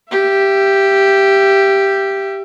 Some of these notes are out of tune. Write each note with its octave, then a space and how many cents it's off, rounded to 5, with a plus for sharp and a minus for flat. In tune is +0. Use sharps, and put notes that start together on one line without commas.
G4 +0 E5 +30